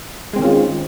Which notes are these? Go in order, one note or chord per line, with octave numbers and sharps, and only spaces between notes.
D#3 G#3 C4 C#4 F4